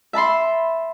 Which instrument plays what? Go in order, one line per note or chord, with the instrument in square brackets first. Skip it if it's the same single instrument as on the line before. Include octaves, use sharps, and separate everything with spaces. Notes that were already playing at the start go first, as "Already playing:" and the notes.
[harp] E5 A5 B5 C6